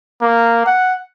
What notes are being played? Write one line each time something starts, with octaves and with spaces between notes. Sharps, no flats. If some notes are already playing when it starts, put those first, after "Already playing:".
A#3
F#5